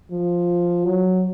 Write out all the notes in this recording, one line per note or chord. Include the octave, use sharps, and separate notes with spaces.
F3
F#3